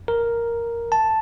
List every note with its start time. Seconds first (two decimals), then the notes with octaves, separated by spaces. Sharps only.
0.08 A#4
0.92 A5